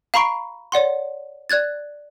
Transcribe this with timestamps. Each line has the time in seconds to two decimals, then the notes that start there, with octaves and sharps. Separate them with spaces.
0.14 F5 A#5 B5 C#6 C7 D7
0.72 C#5 D5 F#5 C6
1.50 D5 F#6 G#6 A6